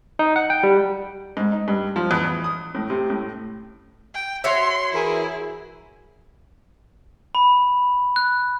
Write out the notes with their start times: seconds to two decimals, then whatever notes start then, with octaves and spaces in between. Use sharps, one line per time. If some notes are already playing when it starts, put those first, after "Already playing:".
0.19 D#4
0.36 F#5
0.50 G5
0.63 G3
1.37 G#2
1.52 D#4
1.68 G2
1.96 F3
2.11 E2
2.25 E2
2.44 D#6
2.75 A2
2.90 C3
3.10 A2
4.14 G5
4.44 F#4 C#5 E5 C6
4.93 E3 E4 G#4 A#4
7.35 B5
8.16 F#6